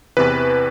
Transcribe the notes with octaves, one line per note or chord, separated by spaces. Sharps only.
E2 C3 E3 B4